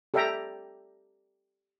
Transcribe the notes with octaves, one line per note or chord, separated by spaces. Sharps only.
G4 A4 D5 E5 G5 A#5